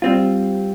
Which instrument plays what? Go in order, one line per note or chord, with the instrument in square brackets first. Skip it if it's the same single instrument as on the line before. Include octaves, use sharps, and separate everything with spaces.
[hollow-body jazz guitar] G3 C4 F4